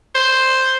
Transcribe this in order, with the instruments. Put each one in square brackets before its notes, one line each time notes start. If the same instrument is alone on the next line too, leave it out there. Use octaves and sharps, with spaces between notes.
[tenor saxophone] C5